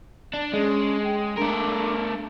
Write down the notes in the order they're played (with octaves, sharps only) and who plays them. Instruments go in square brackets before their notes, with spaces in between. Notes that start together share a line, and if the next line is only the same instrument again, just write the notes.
[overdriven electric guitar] D4
[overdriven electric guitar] G#3 [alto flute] C#4
[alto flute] G5
[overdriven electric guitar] A3 A#4 [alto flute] D4